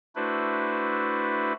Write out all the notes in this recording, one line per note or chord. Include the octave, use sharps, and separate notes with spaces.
A3 D4 E4 F#4 B4 C5